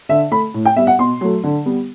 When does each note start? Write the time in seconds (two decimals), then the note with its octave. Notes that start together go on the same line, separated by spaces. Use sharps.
0.09 D3 E5
0.31 A3 B5
0.54 A2
0.65 G5
0.76 G3 B3 E5
0.87 F#5
0.99 B2 C6
1.21 F#3 A3
1.44 D3
1.66 G3 B3